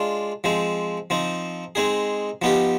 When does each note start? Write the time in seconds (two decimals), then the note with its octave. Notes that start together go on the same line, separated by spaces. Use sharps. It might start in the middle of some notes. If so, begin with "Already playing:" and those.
Already playing: G#3 D4 F4
0.44 F3 G#3 C4
1.10 F3 C4 D#4
1.75 G#3 C4 D#4 G#4
2.42 F3 B3 D#4 G4